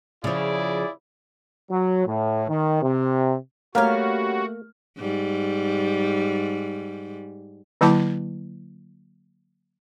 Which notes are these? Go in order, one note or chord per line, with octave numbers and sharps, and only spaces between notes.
C#3 F3 E4 G#4 D5
F#3
A2
D#3
C3
G3 A3 A#3 C#4 F#4 F5 F6
G#2 G3
D3 F#3 A#3 E4 A5 D6